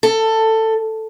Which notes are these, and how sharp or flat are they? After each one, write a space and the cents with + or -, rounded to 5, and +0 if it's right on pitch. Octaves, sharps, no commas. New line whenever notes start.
A4 +15